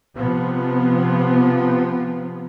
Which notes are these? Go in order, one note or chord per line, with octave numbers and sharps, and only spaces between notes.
C3 F3 B3